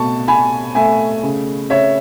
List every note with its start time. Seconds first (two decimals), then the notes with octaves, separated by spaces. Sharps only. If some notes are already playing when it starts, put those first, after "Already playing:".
Already playing: B2 A3 A5 C#6
0.28 B2 G#5 B5
0.75 A3 E5 G#5
1.23 C#3
1.70 C#3 C#5 E5